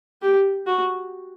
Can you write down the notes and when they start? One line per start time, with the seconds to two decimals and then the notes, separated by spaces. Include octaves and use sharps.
0.22 G4
0.67 F#4